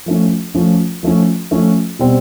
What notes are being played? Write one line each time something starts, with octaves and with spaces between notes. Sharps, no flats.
F3 A3 C#4
F3 A3 C#4
F3 A3 C#4
F3 A3 C#4
B2 G3 C4